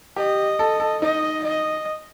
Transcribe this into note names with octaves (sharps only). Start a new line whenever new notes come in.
G4 D#5
A4
A4
D#4 D#5
D#5